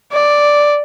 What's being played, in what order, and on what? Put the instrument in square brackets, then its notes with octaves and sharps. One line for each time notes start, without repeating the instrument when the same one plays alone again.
[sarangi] D5